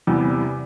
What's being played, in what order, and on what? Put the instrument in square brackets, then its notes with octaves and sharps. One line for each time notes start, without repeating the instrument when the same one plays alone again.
[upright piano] E2 C3 E3 G3 B3